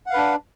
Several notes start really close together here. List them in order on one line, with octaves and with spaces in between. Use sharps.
F#5 F5 B4 D4